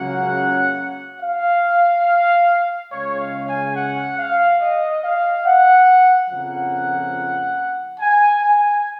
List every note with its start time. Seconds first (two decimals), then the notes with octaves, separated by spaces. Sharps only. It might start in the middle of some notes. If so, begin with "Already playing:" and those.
Already playing: C#2 C#3 F#3 A#3 C#4 F#5
1.21 F5
2.91 C#2 C#3 G#3 C#4 C#5
3.20 F5
3.48 G#5
3.76 F#5
4.18 F5
4.61 D#5
5.03 F5
5.46 F#5
6.30 F2 C#3 F3 A#3 F#5
7.99 G#5
8.42 G#5